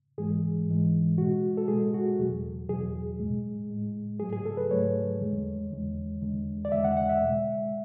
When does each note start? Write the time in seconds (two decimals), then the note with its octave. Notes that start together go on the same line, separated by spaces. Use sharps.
0.18 G#2 E3 G#3 G#4
0.67 G#2 E3 G#3
1.18 B2 G#3 F#4
1.57 A4
1.68 B2 G#3 G#4
1.94 F#4
2.19 E2 B2 F#3
2.69 E2 B2 F#3 G#4
3.20 A2 G#3
3.70 A2 G#3
4.19 G#2 F#3 A3 G#4
4.33 G#4
4.45 A4
4.57 B4
4.70 G#2 F#3 A3 C#5
5.21 E2 D3 G#3
5.71 E2 D3 G#3
6.22 E2 D3 G#3
6.65 D5
6.71 E2 D3 G#3 E5
6.84 F#5
6.97 F#5
7.09 E5
7.22 B2 G#3